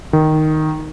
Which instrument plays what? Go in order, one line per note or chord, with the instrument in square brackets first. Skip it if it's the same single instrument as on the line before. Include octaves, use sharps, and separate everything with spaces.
[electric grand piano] D#3